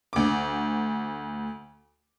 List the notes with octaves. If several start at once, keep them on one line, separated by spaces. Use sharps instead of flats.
D2 D6